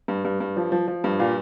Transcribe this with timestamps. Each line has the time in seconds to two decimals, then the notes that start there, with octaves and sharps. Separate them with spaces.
0.08 G2
0.25 G2
0.40 G2
0.57 F3
0.72 F3
0.88 F3
1.04 G2
1.19 A#2 F5